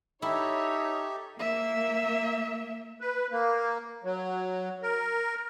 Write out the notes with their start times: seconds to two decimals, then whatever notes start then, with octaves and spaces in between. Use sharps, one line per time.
0.22 D#4 E4 G4 A4 C#5 E5
1.39 A#3 E5
3.01 B4
3.32 A#3
4.04 F#3
4.82 A#4